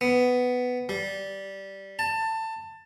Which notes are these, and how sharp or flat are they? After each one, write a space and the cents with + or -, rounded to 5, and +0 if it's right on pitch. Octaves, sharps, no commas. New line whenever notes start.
B3 +10
G3 -10
A5 +20